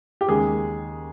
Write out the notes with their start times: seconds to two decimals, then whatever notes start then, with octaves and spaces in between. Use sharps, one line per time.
0.21 G4
0.28 D#2 C#3 G#3 G#4